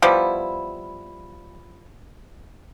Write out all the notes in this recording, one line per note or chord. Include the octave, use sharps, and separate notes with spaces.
F3 G3 B3 E4